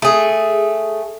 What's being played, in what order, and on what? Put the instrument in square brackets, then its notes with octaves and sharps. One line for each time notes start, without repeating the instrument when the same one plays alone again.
[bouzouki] A3 G#4